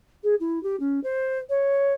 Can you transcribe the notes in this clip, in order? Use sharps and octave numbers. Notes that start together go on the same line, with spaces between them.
G#4
E4
G4
C#4
C5
C#5